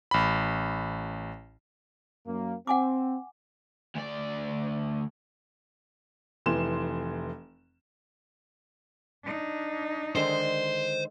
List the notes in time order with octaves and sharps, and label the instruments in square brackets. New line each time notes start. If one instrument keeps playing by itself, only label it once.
[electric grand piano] A1 B5
[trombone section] F#2 A#3
[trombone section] C4 [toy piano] F#5 G#5 D6
[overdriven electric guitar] D2 D5
[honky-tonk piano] F1 E3 C6 E7
[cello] D4 D#4
[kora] D3 D#3 G#3 [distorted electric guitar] C5